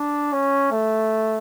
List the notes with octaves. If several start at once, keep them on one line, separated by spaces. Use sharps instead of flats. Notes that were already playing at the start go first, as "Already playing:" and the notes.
Already playing: D4
C#4
A3